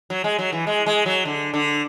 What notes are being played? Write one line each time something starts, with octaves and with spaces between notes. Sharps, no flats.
F#3
G#3
F#3
E3
G#3
G#3
F#3
D3
D3